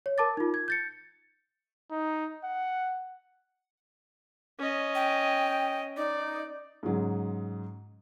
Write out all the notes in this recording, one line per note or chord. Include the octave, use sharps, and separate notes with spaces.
C#5
A#4 A5 D6 A6
D#4 F4
G#6
G6 A6 C#7
D#4
F#5
C#4 D#5
G5
D#4 D5
G#2 C#3 F#3 G#3